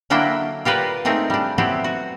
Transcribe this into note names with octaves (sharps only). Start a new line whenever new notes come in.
D3 F#3 A#3 D4 E4 G5
F4 G4 A#4 B4 D5 F#5
A3 C4 D#4 F4 G#4 A#4
G3 D4
F#3 B3 C4 E4 G4
F#4